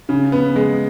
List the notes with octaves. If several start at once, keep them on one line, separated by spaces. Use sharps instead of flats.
C#3
B3
G#3